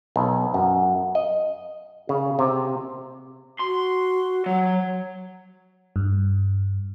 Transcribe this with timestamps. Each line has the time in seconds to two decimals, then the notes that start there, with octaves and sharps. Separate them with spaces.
0.16 B1
0.54 F#2
1.15 D#5
2.09 C#3
2.39 C3
3.60 F#4 C6
4.46 F#3 F#5
5.96 G2